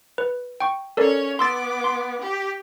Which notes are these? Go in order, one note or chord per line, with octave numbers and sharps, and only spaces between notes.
B4
G5 C#6
C#4 A4 A#4 C#5 D5
B3 C6 D6 E6 A6
C6
G4